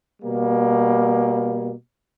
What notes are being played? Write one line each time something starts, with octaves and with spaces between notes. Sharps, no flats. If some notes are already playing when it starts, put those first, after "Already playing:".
B2 G3 A#3